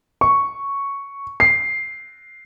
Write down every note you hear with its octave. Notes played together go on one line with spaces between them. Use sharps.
C#6
C7